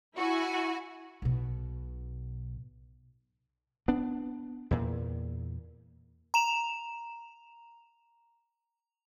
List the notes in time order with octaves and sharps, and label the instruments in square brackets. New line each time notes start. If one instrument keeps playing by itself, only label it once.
[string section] E4 F#4 G#5
[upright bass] B1 B2
[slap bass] B3 D4
E2 A#2
[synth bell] A#5 E7 F7